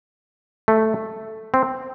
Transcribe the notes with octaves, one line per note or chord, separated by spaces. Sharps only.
A3
C4